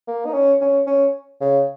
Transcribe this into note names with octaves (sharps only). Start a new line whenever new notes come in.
A#3
D#4
C#4
C#4
C#4
C#3